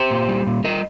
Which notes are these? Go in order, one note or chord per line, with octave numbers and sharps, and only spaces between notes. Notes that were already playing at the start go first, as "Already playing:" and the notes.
Already playing: G4 C5
A#2
G3
A#2
G3 A#4 D#5